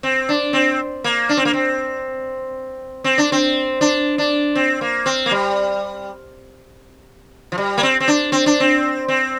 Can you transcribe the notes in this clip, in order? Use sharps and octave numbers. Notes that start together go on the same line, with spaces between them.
C4
D4
C4
A#3
D4
C4
A#3
C4
C4
D4
C4
D4
D4
C4
A#3
C4
A#3
G3
F3
G3
A#3
C4
C4
D4
C4
D4
C4
C4